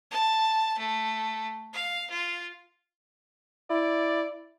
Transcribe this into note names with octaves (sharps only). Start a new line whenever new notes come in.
A5
A3
F5
F4
E4 D5